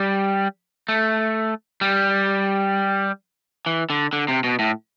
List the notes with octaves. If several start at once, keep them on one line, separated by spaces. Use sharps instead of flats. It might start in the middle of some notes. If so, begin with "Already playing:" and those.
Already playing: G3
A3
G3
E3
D3
D3
C3
B2
A2